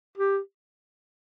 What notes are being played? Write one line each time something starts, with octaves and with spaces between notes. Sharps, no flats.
G4